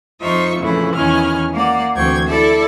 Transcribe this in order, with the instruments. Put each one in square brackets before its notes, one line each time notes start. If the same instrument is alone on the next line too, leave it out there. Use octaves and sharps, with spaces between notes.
[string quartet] F2 D#4 F4 C5 E5 C#6
F2 A#2 C#3 E3 A3 E4
E2 D#3 C#4 E4 F6
A#3 D5 F#5
D2 E3 C4 G5 C#6 G#6
E4 A4 D5 E5 A5